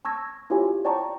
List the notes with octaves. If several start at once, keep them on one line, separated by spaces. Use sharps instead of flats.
A5 C#6 E6 G#6 A#6
E4 F4 G4 C#5 G#5
C#5 D5 G5 A5 A#5 C#6